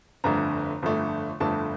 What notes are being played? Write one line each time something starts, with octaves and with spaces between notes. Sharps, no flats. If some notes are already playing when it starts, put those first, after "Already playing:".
G1 F2 D3 A3 A#5
G1 F2 D3 A3
G1 F2 D3 A3 A5